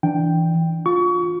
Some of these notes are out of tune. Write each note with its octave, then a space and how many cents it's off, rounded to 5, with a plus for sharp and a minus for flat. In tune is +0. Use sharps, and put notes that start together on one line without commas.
E3 +0 D4 +0 G5 +0
F4 +25 C#6 +30